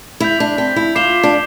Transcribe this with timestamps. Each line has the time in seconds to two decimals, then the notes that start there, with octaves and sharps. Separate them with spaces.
0.20 E4 G6 B6 F7
0.40 D4
0.58 C4
0.76 E4
0.95 F4 D6 G6 C7 E7 G7
1.23 D4